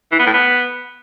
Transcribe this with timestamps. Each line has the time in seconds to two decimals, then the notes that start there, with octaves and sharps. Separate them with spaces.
0.12 E3
0.19 B3
0.26 A2
0.34 B3